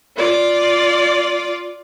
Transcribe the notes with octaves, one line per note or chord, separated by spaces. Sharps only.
F4 D5